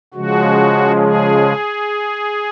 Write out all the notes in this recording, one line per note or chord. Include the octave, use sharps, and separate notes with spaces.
C#3 F3 G#3 F#4
G#4